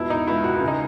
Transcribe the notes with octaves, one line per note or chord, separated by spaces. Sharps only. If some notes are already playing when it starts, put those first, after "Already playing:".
Already playing: E1 B2 E4
D#4
C#2 E4
F#4
C#3 E4
D#4